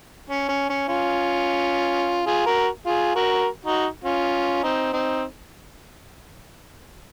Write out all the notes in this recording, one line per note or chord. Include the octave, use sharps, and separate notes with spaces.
C#4
C#4
C#4
C#4 F4
F4 G#4
F#4 A#4
F4 G#4
F#4 A#4
D#4 F#4
C#4 F4
C4 D#4
C4 D#4